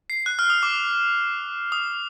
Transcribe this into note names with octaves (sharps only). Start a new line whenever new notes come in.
C7
F#6
F6
D#6
D6
D#6